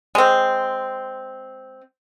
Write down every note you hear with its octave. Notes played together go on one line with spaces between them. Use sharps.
G#3 C4